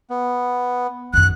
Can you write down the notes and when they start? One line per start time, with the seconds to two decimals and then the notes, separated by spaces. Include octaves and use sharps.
0.10 B3
1.14 F#2 D#3 F#6